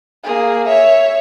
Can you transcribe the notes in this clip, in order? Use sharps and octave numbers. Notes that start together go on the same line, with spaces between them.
A#3 G#4
C#5 E5